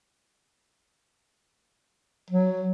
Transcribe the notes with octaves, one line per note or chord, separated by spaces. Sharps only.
F#3